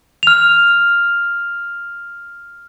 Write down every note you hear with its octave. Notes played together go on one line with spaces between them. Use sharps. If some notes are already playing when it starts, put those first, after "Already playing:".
F6 F7